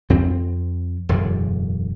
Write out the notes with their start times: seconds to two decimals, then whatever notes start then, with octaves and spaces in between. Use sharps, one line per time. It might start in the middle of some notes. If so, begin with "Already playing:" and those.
0.10 F2 C4
1.09 E1 F#2 A2 D3